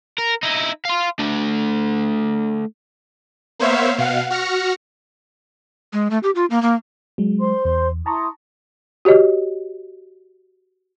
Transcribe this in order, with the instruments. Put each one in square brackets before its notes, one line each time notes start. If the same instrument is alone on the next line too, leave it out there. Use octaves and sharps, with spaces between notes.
[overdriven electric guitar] A#4
D#4 E4
F5 C6
A3 D4
[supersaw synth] A#3 B3 C5 C#5 E5 F5
B2 F5 F#5
F#4 F6 A#6 C#7
[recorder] G#3
A3
G4
F4
A#3
A#3
[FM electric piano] F#3 G#3
[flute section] C5 C6
[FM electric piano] E2
[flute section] E4 C6 D#6 [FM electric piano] A5 A#5 C#6
[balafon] F#4 G4 C#5 D#5